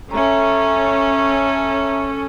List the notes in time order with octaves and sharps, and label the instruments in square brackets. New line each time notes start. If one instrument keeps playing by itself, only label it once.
[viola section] C#4 A4 [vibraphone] E5 A#5